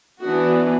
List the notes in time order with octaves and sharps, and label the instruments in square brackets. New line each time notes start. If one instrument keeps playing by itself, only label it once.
[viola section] E3 B3 D4 F#4